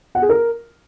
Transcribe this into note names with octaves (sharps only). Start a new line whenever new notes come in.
F#5
G#4
A#4